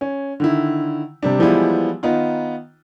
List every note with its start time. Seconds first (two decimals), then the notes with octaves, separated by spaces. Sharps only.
0.01 C#4
0.40 D3 D#3 E4
1.23 C3 G3 D4
1.39 E3 F3 G3 G#3 B3 E4
2.03 D#3 B3 D#4 F4